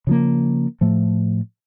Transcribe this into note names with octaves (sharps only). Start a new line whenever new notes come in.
C#3 F3 A#3
A2 F3 A3